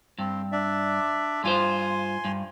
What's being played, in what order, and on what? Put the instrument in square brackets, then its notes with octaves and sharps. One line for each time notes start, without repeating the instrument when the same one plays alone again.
[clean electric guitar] G2 [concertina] C4
[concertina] D4 D5 E5
[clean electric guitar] G2 F4 C5 [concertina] G#5 C6
[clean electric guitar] G2